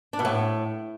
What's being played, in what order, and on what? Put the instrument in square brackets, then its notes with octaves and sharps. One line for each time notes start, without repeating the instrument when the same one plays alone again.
[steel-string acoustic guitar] D4
B2
A2